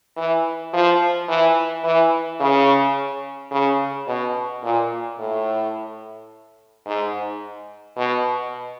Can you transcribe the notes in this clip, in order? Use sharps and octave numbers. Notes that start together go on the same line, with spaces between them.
E3
F3
E3
E3
C#3
C#3
B2
A#2
A2
G#2
B2